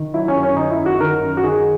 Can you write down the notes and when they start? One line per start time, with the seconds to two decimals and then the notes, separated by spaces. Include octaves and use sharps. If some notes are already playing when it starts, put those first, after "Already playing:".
Already playing: D#3
0.14 F#3 E4
0.28 C#4
0.35 F#2
0.43 C#4
0.56 D#3 D#4
0.71 E4
0.78 F#2
0.86 F#4
1.00 D#3 A#4
1.21 F#2
1.37 F#4
1.43 D#3 G#4